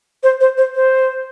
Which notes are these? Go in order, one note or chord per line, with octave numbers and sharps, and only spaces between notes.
C5
C5
C5
C5